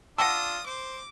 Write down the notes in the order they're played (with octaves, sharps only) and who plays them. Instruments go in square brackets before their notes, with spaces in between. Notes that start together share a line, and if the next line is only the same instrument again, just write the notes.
[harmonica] D4 F4 [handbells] F#5 G5 A5 [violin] D#6 [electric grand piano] E6 A#6
[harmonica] C5 [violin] D6